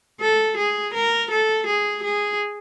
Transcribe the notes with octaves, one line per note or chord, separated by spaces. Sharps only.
A4
G#4
A#4
A4
G#4
G#4